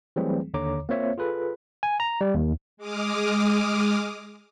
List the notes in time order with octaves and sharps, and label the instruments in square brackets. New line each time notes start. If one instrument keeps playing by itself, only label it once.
[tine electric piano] E3 F#3 G3 A3 C4 G#4
D#2 D3 C#5 A#5 D6
A#3 C4 F4 C5 C#5 E5
F4 G#4 A4 B4
G#5
A#5
G3
D#2
[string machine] G#3 D6 D#6 F6